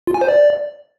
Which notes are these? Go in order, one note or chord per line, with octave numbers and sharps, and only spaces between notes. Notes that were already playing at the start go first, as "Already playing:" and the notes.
F4
G#5
C5
D5